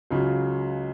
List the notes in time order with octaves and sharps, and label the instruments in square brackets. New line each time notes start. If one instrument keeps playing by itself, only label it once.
[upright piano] C#2 C#3 F#3